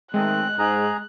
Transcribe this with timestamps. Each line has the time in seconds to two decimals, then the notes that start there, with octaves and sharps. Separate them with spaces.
0.14 D#3 G#3 A3 C4 F#6
0.59 G#2 G#4 A#5